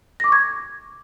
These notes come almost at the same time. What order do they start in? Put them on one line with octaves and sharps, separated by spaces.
A#6 D6 C#6 G#6